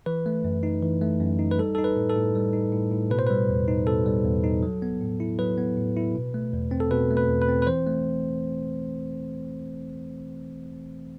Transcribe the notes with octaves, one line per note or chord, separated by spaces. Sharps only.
E3 B4
A3
F#2
D#4
E3
A3
F#2
D#4
B4
G3 A4
D#4 A4
B4
A2
A4
A2
G3
D#4
A2
A2
B2 B4
C5
G3 B4
E2
D#4
B2 A4
G3
E2
D#4
F#3
B3
A2
E4
F#3 B4
B3
A2
E4
B2
A3
E2
C4
A4
B2 B4
A3
B4
E2
B4
C4
B4
E3 C5
A3